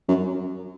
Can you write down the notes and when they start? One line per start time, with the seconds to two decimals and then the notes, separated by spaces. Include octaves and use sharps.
0.08 F#2